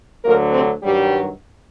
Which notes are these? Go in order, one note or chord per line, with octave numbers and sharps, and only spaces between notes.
D2 D3 F#3 A#3 A#4
C3 C4
G2 D#3 F#3 G3 G4